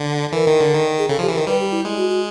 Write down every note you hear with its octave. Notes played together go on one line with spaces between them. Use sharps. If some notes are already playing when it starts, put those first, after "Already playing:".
Already playing: D3
E3 A#4
D#3
D3
D#3
G#4
C#3 A4
F3 G4
E3
D#3 A#4
G3 B4
G4
E4
G#3
F#4
F#4